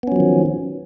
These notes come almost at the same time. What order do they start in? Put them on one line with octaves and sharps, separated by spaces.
B3 C#4 F#3 F3 D#3